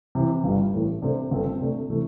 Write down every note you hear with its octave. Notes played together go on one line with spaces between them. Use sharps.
C3 E3 C4
G1 G2 D3 G3
A1 A2 A3
C3 A3 D4 A4 C5
G1 G2 G3 C4 A4
C3 A3 D4
C3 E3 A3